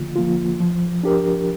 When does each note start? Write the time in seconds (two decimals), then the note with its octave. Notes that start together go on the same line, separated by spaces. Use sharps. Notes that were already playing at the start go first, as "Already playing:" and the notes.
Already playing: D3 F3 A#3 F4
0.16 F3 A#3 F4
0.60 F3
1.03 D4 G4 A#4